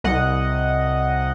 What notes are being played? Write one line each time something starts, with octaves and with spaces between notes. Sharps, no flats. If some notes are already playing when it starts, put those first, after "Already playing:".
C2 D#5 F#5